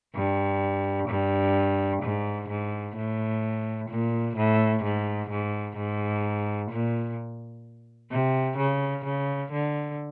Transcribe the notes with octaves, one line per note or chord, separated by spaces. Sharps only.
G2
G2
G#2
G#2
A2
A#2
A2
G#2
G#2
G#2
A#2
C3
C#3
C#3
D3